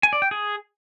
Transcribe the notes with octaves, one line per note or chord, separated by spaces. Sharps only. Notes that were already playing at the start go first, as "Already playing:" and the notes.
G#5
D5
G5
G#4